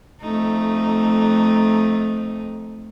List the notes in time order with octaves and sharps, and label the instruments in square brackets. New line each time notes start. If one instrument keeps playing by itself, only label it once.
[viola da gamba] F2 A3 D#4